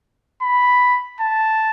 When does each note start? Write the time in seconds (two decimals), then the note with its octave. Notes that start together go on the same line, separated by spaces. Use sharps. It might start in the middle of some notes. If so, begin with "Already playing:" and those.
0.42 B5
1.21 A5